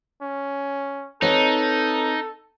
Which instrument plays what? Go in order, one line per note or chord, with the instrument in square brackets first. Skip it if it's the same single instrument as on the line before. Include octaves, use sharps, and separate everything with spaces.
[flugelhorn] C#4
[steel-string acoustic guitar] C4 B4 C#5 [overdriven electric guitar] D#4 [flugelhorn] A4